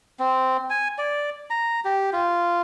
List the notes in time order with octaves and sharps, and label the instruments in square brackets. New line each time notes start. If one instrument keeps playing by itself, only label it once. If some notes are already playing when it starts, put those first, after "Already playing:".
[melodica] C4
G#5
D5
A#5
G4
F4